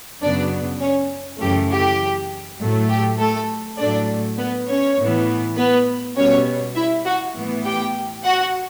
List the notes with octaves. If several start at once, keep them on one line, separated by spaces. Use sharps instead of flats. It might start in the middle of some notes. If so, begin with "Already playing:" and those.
F#2 C#3 F#3 B3 D4 D5
C#4 C#5
F#2 C#3 E3 A3 G4
G4
A2 F#3 A3
G4
A3 A4
A2 F#3 A3 D4 D5
B3 B4
C#4 C#5
A2 E3 B3
B3 B4
B2 G3 B3 C#4 C#5
E4 E5
F#4 F#5
A2 E3 B3
G4 G5
F#4 F#5